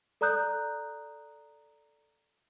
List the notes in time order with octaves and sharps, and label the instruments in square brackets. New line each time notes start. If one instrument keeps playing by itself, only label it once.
[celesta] A4 D5 A#5 D#6 F#6 G6